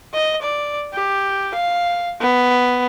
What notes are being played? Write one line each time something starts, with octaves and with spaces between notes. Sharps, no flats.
D#5
D5
G4
F5
B3